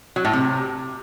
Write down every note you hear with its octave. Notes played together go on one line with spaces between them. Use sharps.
F#3
A2
C3